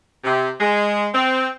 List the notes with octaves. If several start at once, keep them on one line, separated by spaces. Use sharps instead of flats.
C3
G#3
C4